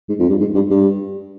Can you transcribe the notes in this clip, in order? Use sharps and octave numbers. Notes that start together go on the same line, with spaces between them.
G#2
F2
G2
G#2
G2
G2